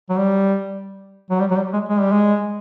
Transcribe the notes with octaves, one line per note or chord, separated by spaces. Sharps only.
F#3
G3
F#3
G3
F#3
G3
G#3
G#3
G3
G#3